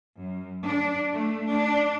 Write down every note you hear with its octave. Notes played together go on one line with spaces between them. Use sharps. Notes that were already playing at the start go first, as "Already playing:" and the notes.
F#2
D4
A3
D4